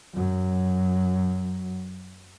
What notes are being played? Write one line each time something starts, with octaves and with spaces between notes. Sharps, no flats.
F#2 F#3